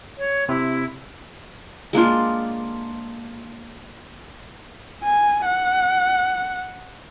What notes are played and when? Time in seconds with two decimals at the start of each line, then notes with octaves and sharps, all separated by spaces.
0.18 C#5
0.49 C3 E4
1.93 G#3 A#3 D4 F4
5.04 G#5
5.46 F#5